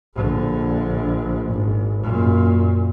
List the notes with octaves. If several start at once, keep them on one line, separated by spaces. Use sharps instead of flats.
A#1 D3
G#1
F#2 A#2